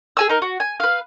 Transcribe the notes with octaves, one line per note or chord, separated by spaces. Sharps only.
G#4 G#5 E6
D#4 A#4
F#4
G#5
B4 F5